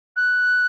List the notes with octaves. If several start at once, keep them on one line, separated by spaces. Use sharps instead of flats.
F#6